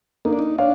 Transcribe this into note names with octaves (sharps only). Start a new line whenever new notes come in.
A#3 D#4
D4
D#4
D4 C#5 F5